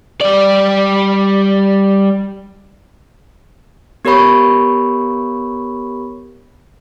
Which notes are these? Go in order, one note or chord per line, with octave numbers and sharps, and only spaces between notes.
G3 D5
B3 G4 A#4 C#5 B5 C#6